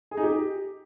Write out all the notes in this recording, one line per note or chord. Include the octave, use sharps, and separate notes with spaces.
G#4
D#4
G4